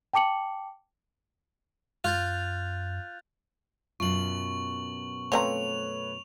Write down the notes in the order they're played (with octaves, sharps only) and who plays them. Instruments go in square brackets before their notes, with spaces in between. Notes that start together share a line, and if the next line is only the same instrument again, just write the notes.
[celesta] G5 A5 D6 C#7 F#7
[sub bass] F#2 [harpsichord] F4 [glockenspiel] F#6 G6 A6
[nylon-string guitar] F#2 B2 F4 [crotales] C#6 F#7
[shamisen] F3 C4 A#5 [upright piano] A3 B4 C#5 [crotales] F7